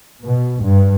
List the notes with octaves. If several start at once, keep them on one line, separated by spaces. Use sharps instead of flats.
B2
G2